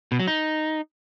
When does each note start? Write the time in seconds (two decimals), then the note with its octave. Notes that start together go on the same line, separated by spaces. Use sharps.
0.12 B2
0.20 F#3
0.27 D#4